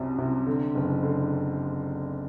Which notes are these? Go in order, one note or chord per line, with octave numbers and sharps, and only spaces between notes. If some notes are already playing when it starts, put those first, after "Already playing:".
Already playing: C2 F#2 C3
C3
D3
F#1
D3